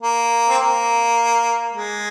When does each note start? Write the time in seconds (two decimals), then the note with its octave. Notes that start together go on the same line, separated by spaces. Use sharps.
0.02 A#3
0.49 C4
0.59 A#3
1.74 G#3